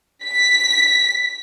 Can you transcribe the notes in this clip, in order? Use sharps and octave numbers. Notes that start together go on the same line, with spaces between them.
B6